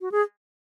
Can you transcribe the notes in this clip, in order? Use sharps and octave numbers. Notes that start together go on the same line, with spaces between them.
F#4
G#4